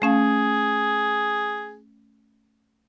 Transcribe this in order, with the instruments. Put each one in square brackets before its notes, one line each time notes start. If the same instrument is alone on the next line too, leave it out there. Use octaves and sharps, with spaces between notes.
[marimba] A3 C#4 F5 [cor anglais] G#4